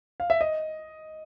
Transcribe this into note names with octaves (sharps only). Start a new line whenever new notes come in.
F5
E5
D#5